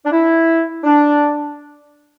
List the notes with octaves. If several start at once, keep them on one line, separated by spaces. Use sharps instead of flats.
D4
E4
D4